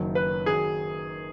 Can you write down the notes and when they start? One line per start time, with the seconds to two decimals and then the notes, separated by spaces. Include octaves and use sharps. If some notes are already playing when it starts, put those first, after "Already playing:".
Already playing: F#1 F#2 D#3 F#3
0.15 B4
0.46 D#3 F#3 G#4